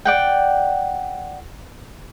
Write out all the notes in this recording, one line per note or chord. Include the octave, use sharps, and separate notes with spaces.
D5 F#5 G5